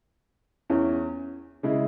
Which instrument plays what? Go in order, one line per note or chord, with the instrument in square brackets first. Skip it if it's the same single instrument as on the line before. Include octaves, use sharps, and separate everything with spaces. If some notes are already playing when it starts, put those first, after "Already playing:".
[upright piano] E2 E3 C#4
C#3 G#3 E4